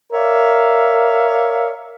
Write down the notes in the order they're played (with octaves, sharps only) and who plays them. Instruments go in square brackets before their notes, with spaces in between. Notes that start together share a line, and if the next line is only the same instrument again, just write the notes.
[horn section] A#4 C#5 D5 E5 F5